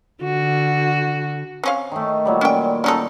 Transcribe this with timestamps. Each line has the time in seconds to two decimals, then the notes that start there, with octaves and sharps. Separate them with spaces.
0.23 D3 F#4
1.64 C4 C#4 F5
1.92 D#3 A3
2.25 A#2 F#3 G3
2.41 C#4 G5
2.84 C#4 D#4 A4